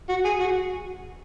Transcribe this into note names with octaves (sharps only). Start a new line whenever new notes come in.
F#4
G#4
F#4